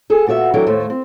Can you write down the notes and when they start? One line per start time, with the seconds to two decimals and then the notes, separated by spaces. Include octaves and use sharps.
0.10 G#4 A4
0.26 A#2 B3 F#4 C#5 E5
0.54 E3 F#3 D4 E4 A4 G5
0.67 D#2 A2 A3 A4 C5
0.90 C4